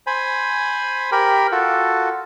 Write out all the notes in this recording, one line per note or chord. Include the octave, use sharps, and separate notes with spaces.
C5 G#5 B5
G4 A#4 B5
F4 F#4 A4